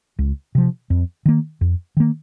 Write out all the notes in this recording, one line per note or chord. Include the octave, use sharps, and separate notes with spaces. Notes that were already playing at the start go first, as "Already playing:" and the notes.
C#2
C3 F3
F2
D#3 A#3
F2
D#3 A#3